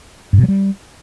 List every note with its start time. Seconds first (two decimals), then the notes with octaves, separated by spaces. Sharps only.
0.33 G2
0.38 B2
0.43 F#3
0.48 G3